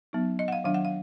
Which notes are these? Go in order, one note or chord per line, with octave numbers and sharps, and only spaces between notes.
F#3 B3 D#4
D#5
F#5
F5
D#3 F#3 D4 F5
F#5
F5